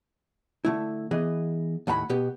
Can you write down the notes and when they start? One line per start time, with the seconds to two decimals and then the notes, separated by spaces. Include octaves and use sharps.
0.65 D3 A3 E4
1.11 E3 B3 G#4 D#5
1.87 D#2 A2 F#5 A#5 B5
2.09 B2 B3 G4